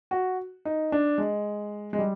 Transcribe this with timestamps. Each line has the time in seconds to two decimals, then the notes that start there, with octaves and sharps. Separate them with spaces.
0.11 F#4
0.65 D#4
0.92 D4
1.18 G#3
1.93 G#3
1.99 G3